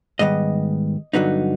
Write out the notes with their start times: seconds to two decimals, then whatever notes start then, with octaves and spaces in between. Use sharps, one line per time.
0.19 G#2 D#3 G3 B3 D#5
1.13 G2 D3 F#3 B3 D#4